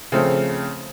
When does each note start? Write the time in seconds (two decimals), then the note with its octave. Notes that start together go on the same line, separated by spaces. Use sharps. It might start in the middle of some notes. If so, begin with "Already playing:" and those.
0.12 C#3 F3 A3 C4